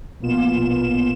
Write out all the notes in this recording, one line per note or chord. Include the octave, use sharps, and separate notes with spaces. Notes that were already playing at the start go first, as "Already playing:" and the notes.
A#1 B2 A#3 B3 F4 E7